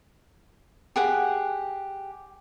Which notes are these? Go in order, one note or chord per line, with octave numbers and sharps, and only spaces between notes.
G4 G#4 F#5